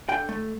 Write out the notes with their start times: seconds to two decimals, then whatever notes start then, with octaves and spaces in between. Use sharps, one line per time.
0.09 D3 G5
0.29 A3